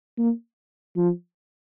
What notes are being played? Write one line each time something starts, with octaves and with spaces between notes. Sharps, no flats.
A#3
F3